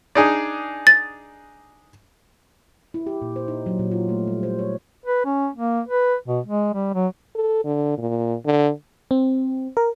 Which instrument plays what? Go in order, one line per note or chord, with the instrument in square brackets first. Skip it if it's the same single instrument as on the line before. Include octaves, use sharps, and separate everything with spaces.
[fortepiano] D4 D#4 G#4
[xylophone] A6
[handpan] E4
G4
A#2
C5
D#4
F#3
A#2
F4
A3
G3
C5
C#5
[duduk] B4
C#4
A#3
B4
B2
G#3
G3
F#3
[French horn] A4
D3
A#2
D3
[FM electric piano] C4
A#4